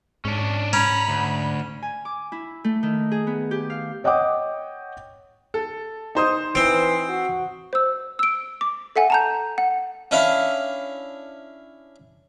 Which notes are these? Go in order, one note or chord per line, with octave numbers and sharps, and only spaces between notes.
G#2 C#4 D4
C#4 A#5 B5
D2
G#5
D6
E4
A3
D#3
G#4
B3
G4
F5
C#5 D#5 F#5 G5 D6 D#6
A4
D#4 C5 D#6
E3 C4
F#4
C5 E6
E6 D7
D6
A4 E5 F#5 G#5
A5 A#5 G6
F#5
C#4 D4 E4 F5